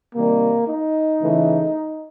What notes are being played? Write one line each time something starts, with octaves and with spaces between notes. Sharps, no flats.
C3 D#3 G3 A#3
D#4
C#3 E3 A3